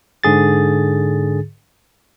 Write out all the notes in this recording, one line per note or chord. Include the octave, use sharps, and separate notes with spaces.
G#2 D3 G#4 A6